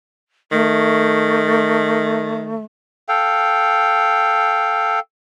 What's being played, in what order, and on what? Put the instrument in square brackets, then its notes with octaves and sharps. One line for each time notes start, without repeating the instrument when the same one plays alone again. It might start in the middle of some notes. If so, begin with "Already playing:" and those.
[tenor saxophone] D#3 [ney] A3
[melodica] A4 F5 G5